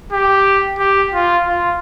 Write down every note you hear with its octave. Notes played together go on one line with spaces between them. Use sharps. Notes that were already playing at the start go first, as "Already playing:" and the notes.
G4
G4
F4
F4